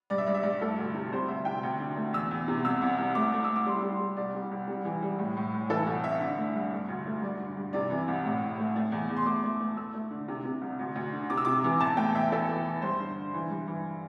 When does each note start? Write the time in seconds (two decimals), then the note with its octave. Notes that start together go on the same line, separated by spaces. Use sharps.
0.10 G2 D5
0.18 E5
0.27 G2 D5
0.34 E5
0.43 G2 D5
0.61 A3 A4
0.79 D2
0.94 C3
1.12 G3 C5
1.28 D2 E5
1.45 C3 G5
1.63 D2
1.80 D3
1.96 A3
2.13 E2 E6
2.31 E2
2.48 C3
2.64 C2 E6
2.82 C2
2.98 C2
3.15 A3 D6
3.33 A3
3.44 E6
3.50 A3
3.56 D6
3.66 G3 C6
3.83 G3
4.00 G3
4.17 C2 D5
4.34 G3
4.51 C2
4.68 G3
4.85 E3
5.02 G3
5.18 A2
5.36 A2
5.54 A2
5.69 E3 A4
5.86 C2
6.04 C2 E5
6.20 D3
6.38 A3
6.55 G2
6.72 A3
6.89 D2
7.06 A3
7.22 G2 D5
7.39 D3
7.57 G2
7.73 C3 D5
7.90 E3
8.08 C2
8.25 A2
8.42 A2
8.58 A3
8.76 A3
8.92 E2
9.10 E2
9.17 C6
9.26 A3 D6
9.44 A3
9.60 A3
9.77 A3 E6
9.94 A3
10.10 D3
10.28 C3
10.45 C3
10.61 C2
10.79 D2
10.96 D2
11.13 D3
11.30 C3 D6
11.37 E6
11.45 C3 D6
11.64 E3
11.80 E2 A5
11.97 A3 G5
12.14 E2 E5
12.31 E3 A4
12.48 E3
12.65 E3
12.82 G2 C5
13.00 D3
13.17 D3
13.34 E3
13.50 G2
13.67 E3